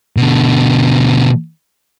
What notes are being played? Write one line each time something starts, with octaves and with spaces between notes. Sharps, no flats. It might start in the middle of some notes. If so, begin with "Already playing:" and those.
B2 D3